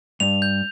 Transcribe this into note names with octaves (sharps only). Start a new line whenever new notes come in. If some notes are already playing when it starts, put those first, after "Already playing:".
G2 F7
G6